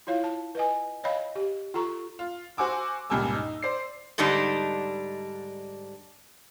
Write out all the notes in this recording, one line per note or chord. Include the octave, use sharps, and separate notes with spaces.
E4 F4 C#5 F5
A5
B4 D#5 G#5
C#5 D#5 F5 G5 B5
G4
F4 A4 A#5 C#6
F4
F#4 C5 F#5 G#5 D6 E6
C#2 G2 A#2 G4 G#5 E6
D#4
C5 D5 C7
G#2 D3 G3 D4 D#4